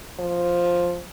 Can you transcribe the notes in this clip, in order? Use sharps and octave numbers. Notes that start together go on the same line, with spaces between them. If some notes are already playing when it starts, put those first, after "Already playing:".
F3